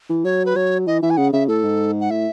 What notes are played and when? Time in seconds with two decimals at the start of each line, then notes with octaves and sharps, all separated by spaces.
0.10 E3
0.24 F#3 C#5
0.46 B4
0.55 F#3 C#5
0.86 E3 D#5
1.02 E3 E5
1.10 G#5
1.17 C#3 F#5
1.33 C#3 E5
1.48 A2 A4
1.64 G#2
2.00 F#5
2.11 A2 E5